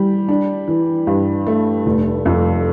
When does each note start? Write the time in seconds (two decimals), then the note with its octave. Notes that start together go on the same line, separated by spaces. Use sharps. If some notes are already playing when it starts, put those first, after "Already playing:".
Already playing: E3 G3
0.29 D4
0.68 E3
1.07 G2
1.47 A3
1.86 F1
2.25 F2